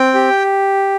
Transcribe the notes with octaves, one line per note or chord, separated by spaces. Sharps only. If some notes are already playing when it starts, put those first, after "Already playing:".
Already playing: C4 G5
G4